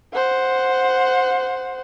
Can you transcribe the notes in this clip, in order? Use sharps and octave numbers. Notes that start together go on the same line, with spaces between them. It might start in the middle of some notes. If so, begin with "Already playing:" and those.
C5 F#5